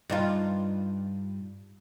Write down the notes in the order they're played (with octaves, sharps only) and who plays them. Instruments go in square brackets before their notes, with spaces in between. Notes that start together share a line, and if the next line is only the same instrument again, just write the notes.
[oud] G2 D#4 F4